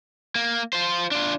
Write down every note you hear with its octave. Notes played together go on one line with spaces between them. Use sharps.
A#3
F4 C5
D4 F4